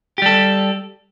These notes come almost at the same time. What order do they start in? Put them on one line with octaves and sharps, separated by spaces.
G4 G3 A4